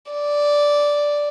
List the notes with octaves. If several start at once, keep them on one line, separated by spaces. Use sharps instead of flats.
D5